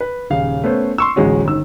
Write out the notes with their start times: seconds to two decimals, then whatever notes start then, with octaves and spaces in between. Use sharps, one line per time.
0.01 B4
0.30 D#1 C#3 F5
0.64 A3 B3 C#4 C5
0.98 C6 C#6 E6
1.16 D1 A1 F#3 G#3 C#4 F#4
1.45 G1 D#3 E6